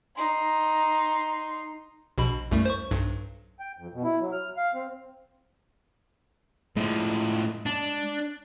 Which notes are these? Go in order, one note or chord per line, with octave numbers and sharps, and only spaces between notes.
D#4 C6
A#1 B2 B5
C2 F#2 A3
C5 C#6
B1 G2
G5
F2
B2
E4
F#3
F6
F5
C4
A2 F3 G#3
D4